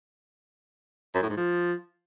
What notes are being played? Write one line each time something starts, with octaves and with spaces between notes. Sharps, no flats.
F#2
A2
G#2
F3